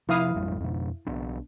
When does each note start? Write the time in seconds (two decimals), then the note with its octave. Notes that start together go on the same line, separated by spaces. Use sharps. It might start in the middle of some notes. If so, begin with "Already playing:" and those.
0.09 C3 F3 E4 F5 D#6
0.35 A1 F2 G3
0.60 F2 B2
1.07 B1 B3 D4